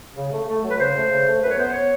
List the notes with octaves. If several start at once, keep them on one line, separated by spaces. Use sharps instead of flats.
C#3
A3
A3
F#3
B4
C#3 C5
A3
C#3
A3
F#2 B4
C#5
B3 C5
C#5